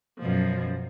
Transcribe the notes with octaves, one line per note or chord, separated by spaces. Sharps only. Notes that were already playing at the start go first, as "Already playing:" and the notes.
F#2 B2 F3